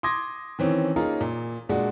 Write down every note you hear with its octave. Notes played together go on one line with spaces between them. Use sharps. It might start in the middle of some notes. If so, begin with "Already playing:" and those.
C6 D6 D#6 G#6 A#6
D#3 E3 C4 C#4
A#3 C#4 D#4 F4 G#4 A#4
A#2
A#2 G#3 D4 F#4